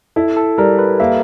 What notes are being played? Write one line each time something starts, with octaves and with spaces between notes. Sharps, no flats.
E4 A4
A4
G3 A#4
B4
A#3 E5